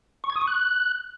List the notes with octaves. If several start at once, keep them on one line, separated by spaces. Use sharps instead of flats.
C#6
G#6
D#6
C#6
F#6